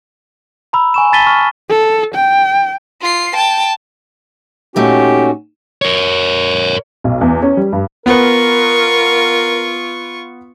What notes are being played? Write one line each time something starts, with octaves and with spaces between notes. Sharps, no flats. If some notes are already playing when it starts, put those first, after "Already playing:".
A#5 B5 E6
G#5 C#6 E7
A5 B5 A6 B6 D#7 G7
C#6 F6
A4
G5
F4 C7
G5 A5
A#2 A3 C#4 D#4 F#4 G4
A#4 C#5
B1
E2
C#4
G3
G2
B3 F4 A#4 B4 C#6